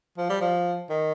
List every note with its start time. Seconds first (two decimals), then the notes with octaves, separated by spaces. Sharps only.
0.17 F3
0.29 G3
0.41 F3
0.90 D#3